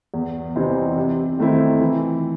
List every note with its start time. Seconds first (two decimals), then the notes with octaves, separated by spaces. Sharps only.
0.14 E2
0.56 C3 E3 C4 D#4
0.97 C3
1.39 D#3 A3 C4 E4
1.81 E3